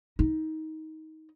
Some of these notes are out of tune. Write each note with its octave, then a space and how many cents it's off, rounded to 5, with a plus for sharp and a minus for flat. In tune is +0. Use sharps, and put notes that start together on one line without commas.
D#4 +20